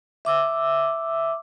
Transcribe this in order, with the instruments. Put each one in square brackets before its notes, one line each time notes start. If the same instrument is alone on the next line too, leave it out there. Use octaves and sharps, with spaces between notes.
[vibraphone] E5 D6 E6